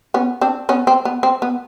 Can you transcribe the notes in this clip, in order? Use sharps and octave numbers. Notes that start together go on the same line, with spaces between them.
B3 C#4
C4 D4
B3 C#4
C4
B3
C4
B3